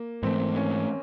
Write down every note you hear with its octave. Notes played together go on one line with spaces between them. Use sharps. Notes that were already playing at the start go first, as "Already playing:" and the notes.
Already playing: A#3
G#2 E3 A3 C4
C#4